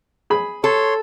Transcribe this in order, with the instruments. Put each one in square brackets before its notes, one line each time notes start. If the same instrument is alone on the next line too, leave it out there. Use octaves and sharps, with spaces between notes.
[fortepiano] G#4 B5
[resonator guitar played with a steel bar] A4 [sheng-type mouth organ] C#5 C6